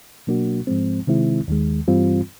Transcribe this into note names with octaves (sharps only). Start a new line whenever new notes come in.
B2 F#3 A#3 D4 F#4
G#2 F3 G#3 C4
C3 D#3 G#3 C4 E4
D#2 D#3 G#3
G2 E3 G3 C4 F4